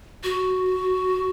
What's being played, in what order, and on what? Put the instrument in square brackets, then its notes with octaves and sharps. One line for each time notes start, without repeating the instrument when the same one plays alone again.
[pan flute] F#4